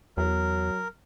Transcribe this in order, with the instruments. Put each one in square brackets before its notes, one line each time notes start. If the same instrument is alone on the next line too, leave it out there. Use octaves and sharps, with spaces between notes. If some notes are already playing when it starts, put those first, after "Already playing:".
[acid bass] E2 [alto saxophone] F#3 [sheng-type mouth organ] A#4